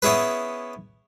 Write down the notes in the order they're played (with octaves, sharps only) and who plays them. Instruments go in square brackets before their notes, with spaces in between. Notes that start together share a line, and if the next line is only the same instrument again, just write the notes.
[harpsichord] B3 C#4 E4 G#4 B4